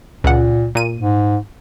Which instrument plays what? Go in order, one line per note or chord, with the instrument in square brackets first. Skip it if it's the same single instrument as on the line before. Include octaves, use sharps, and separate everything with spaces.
[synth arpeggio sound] C#2 F#5 [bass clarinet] A#2
[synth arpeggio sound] A#2 D#7
[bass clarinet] G#2